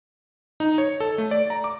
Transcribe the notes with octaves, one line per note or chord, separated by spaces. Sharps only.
D#4
C#5
A4
A3
D5
A#5
D6